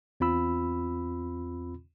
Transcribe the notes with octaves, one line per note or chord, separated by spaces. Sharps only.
E2 C4 F4 B5 E6